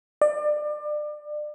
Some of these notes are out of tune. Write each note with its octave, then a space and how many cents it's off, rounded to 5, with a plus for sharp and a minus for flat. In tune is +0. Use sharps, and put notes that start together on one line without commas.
D5 +30